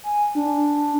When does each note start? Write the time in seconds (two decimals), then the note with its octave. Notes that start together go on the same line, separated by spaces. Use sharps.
0.03 G#5
0.35 D4